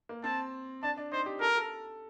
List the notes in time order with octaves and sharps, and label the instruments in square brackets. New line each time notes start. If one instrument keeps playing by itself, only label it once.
[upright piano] A#3
[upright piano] C4 [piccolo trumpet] A5
[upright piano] D4 [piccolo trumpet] A5
[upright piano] D4
[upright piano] D#4 [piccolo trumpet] C5
[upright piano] G4
[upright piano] A4 [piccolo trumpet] A#4
[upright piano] A4